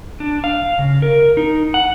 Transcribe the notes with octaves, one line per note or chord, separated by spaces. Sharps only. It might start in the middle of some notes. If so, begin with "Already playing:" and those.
D4
F5
C#3
A#4
D#4
F#5